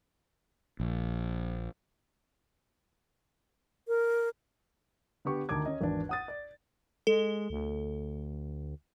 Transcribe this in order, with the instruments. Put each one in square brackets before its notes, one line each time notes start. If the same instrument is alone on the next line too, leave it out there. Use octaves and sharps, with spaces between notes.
[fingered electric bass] A#1
[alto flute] A#4
[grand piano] D3 B3 G4 C#6
D2 D#3 A5 D6 G#6
C#4 D#5
G#1 E2 D4
F#5 D#6 A6
D5
[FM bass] G#3 [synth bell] A4
[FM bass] D2